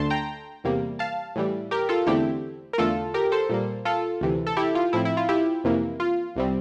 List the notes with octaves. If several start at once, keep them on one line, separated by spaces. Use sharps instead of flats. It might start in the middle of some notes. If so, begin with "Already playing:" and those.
Already playing: D2 D3 A3 A5 C6
G5 A#5
E2 C3 G3 A#3
F5 A5
A2 E3 G3
G4 A#4
F4 A4
E2 D3 A3 C4 E4 G4
A#4
E2 D3 A3 F4 A4
G4 A#4
A4 C5
A#2 G3 A#3
F4 A4
D2 C3 E3
A4
E4 G4
F4
A2 F3 C4 E4
E4
F4
E4 G4
F2 C3 E3 A#3
F4
C2 C3 G3 C4